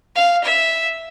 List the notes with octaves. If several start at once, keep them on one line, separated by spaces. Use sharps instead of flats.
F5
E5